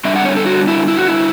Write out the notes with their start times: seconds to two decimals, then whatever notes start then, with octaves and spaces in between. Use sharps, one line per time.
0.05 D3 G3 D4 E5
0.16 F#5
0.25 C#5
0.36 A4
0.46 F#4
0.67 E4
0.88 E4
0.97 F#4
1.07 E4